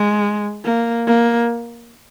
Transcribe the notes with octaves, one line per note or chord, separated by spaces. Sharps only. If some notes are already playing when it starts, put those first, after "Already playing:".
Already playing: G#3
A#3
A#3